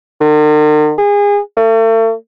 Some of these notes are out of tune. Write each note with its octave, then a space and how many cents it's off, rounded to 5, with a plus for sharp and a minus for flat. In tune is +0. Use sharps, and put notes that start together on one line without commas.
D#3 -45
G#4 -30
A3 +40